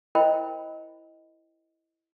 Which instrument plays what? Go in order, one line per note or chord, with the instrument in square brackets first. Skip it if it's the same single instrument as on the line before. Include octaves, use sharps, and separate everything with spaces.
[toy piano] E4 A#4 C5 D#5 G5 B5